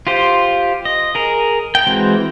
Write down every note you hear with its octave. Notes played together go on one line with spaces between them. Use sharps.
F4 G4 C5
D#5
G#4 A#4
G5
E3 G#3 C4 F#4